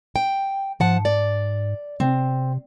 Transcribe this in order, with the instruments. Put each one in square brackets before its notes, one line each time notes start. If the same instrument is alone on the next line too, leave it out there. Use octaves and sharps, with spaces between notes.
[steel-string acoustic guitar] G5
[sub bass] G#2 [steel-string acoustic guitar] F3 F#5 A5
[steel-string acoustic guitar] D5
[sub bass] C3 [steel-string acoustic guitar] C4